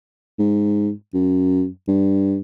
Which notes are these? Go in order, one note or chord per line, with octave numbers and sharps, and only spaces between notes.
G#2
F#2
G2